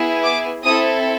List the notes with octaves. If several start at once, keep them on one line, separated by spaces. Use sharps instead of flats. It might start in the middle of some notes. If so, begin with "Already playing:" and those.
Already playing: B3 E4 G#4
D6
C4 E4 A4 D#6